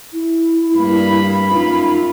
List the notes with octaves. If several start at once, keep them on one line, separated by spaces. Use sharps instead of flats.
E4
G2 A#3 B5
F#2 D#4 F4